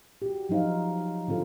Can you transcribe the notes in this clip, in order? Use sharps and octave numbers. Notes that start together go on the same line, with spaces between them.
F#4 G4
F3 F#3 D#4 C5 F5
D3 C4 F4 A4